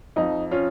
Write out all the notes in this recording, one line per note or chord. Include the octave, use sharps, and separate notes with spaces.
F2 F3 D#4
C#4 F4